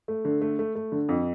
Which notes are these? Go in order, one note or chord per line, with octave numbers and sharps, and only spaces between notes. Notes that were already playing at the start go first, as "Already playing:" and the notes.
A3
D3
A3
A3
A3
D3
F2